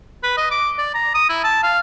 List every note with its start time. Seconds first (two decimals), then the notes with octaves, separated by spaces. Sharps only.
0.23 B4
0.37 D#5
0.51 D6
0.78 D5
0.94 A#5
1.15 D#6
1.29 E4
1.44 A5
1.63 F5